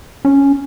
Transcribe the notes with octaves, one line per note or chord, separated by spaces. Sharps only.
C#4